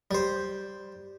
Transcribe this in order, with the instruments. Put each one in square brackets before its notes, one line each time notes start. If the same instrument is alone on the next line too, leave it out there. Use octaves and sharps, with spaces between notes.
[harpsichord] G3 C5